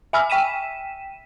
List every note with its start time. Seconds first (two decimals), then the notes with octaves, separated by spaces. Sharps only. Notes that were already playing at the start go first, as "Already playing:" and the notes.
0.13 E5 G#5 B5 E6 F6
0.30 G5 B6 D#7 E7